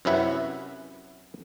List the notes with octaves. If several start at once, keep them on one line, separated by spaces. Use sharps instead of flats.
F#2 C3 C#4 E4 B4 F#5